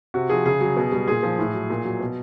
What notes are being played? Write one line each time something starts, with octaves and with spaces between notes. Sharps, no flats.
C3 F#4
F3 G#4
C#3 G#4
F#3
B2
G3
A#2 G#4
F3
A2
F#3
A#2
F#3
B2